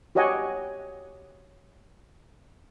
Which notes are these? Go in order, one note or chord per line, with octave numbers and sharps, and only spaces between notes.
F#4 G4 C#5 D#5 F#5 G#5